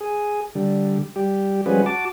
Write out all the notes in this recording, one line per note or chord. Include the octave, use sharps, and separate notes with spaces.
G#4
D3 G3
G3 G4
F3 G3 G#3 C#4 F#4 B4
F#4 A5 D6